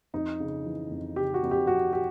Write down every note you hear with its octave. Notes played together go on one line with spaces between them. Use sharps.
F2 D#4
C#3
E3
F2
C#3 G4
F#4
F2
G4
F2 F#4
G4